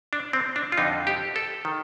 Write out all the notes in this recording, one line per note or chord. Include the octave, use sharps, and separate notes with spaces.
D4
C4
D4
F4
F2 D3 D#4
G4
A4
D#3